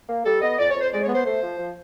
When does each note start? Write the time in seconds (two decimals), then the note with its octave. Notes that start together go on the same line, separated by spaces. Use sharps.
0.09 A#3
0.25 G3 A4
0.42 B3 D#5
0.58 F2 D5
0.70 C#5
0.75 F2
0.81 C5
0.92 G#3 D5
1.03 C#5
1.08 B3
1.14 C5
1.25 A3 C5
1.42 F3
1.58 F3